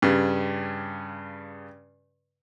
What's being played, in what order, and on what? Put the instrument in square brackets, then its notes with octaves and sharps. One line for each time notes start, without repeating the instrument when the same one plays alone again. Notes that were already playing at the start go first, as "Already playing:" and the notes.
[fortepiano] G2 C#3